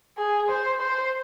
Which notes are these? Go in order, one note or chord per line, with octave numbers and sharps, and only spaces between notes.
G#4
C5
C5